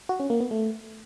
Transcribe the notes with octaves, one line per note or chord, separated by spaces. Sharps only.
F#4
C#4
A#3
B3
A3